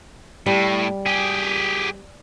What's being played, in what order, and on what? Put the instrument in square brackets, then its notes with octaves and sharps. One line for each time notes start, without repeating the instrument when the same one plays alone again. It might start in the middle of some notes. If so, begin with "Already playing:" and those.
[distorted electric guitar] A2 [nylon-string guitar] G3
[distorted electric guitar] G4 G#4